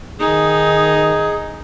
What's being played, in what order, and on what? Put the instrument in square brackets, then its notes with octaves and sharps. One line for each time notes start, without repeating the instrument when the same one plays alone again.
[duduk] D#3 [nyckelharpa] D#4 [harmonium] G#4 [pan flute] D#6